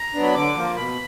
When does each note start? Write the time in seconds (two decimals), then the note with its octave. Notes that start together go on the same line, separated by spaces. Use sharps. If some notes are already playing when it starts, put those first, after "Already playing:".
Already playing: A#5
0.14 F#3 B3 D4
0.23 B5
0.35 D3 D6
0.55 F3 A#3
0.76 B2 B5